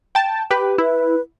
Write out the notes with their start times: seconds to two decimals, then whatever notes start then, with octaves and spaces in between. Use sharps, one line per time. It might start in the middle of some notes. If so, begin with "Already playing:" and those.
0.15 G5 A5
0.51 G4 B4 G5
0.78 E4 B4